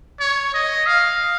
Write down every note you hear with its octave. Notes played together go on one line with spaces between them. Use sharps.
C#5
D#5
F5